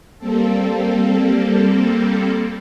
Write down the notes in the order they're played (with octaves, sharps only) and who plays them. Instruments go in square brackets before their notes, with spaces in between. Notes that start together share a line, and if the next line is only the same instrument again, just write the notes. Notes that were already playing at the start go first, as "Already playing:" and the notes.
[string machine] G3 A#3 C4 A4